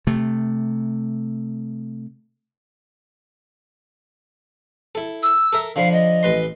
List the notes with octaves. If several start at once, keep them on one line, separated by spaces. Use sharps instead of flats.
C3 A3
E4 A4
E6
A4 A#4 E5
D3 F3 F5 B5
D#5
A1 B4 C6